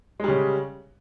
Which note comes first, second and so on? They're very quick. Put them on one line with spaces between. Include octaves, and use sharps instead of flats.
G#3 G3 C#3